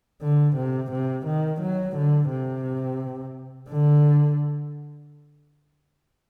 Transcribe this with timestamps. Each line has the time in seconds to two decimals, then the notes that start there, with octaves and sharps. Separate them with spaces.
0.22 D3
0.57 C3
0.92 C3
1.26 D#3
1.61 F#3
1.96 D3
2.30 C3
3.70 D3